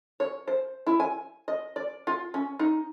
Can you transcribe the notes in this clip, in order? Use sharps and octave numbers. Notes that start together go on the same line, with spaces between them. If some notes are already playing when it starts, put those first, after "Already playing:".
C#5
C5
E4
G#5
D#5
D5
F4
C#4
D#4